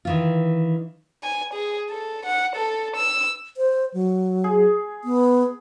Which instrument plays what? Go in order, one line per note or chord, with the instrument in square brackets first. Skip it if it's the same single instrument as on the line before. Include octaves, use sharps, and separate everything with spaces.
[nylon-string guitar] D#3 E3 F4
[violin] G#5
G#4
A4
F#5
A4
E6
[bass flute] C5
F#3
[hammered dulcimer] G#4
[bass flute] B3